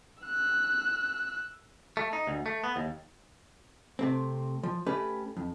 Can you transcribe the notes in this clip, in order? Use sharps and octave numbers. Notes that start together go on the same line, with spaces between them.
E6 F#6
A3
D#4
D2
A3
B3
D#2
C3 A3 C4
F3
A3 C#4 G4 B4
F2